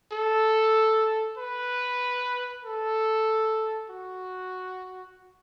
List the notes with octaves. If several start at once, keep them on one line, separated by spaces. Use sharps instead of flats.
A4
B4
A4
F#4